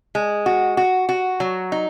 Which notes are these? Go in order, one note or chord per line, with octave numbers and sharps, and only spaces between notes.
G#3
F#4
F#4
F#4
F#3
D#4